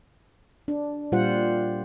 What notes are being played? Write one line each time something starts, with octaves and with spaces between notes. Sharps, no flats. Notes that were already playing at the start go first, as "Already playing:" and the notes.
D4
A#2 G3 F4 C5 F#5